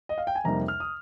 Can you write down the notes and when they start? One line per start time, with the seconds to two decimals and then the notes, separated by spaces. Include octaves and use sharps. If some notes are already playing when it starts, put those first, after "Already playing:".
0.09 D#5
0.18 F5
0.27 G5
0.35 G#5
0.44 F2 C3 G3 A#3 D#4 A#5
0.68 F6
0.80 D#6